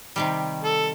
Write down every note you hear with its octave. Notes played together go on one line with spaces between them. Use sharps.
C3 D#3 G3
A4